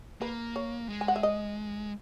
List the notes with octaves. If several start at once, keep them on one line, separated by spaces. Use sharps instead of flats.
A#3 B4
C#5
G#3
G#5
F#5
E5
D#5